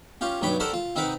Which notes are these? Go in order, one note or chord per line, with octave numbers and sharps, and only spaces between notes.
C#4 F4 G4
B1 G2 C#5 G5 B5 D6
G4 A4 A#4 C5 D5 F#5
F4
C4 D#4 A#4 B4 F#5